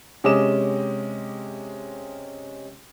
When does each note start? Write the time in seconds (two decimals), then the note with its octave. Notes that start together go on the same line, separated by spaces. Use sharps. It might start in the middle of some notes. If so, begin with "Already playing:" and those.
0.24 C3 G#3 C#4 D6 D#6 E7